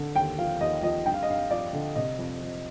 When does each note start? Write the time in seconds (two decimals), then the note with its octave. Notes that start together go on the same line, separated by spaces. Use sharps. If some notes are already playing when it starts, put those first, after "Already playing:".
Already playing: D3
0.15 D#2 G5
0.38 F3 F5
0.61 D#2 D#5
0.83 F3 D#5
1.05 G2 G5
1.14 F5
1.23 D#5
1.28 G2 F5
1.51 F3 D5
1.73 D3
1.96 C3 D#5
2.19 F2
2.41 F2